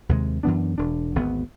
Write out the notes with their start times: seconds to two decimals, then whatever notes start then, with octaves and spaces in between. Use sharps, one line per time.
0.09 D#2 C3 G#3
0.43 F#2 E3 B3 D4
0.78 E1 D4
1.15 G#1 D2 B3